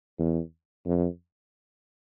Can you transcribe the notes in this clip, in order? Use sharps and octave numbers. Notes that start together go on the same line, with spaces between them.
E2
F2